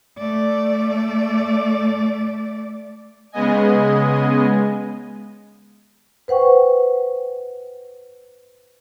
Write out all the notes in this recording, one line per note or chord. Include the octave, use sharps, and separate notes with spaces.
A3 D5
C#3 G#3 B3 D#5 G#5
B4 C5 F#5 G5 C#6